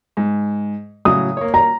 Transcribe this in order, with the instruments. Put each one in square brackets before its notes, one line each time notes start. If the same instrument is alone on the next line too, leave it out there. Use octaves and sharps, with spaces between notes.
[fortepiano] G#2
[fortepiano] A2 C#3 F#3 [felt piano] D#6
[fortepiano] A#3 C#5
[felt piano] A#5